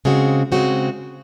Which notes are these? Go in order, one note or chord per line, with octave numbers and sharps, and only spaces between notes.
C#3 G#3 C4 F#4
C#3 G#3 C4 F#4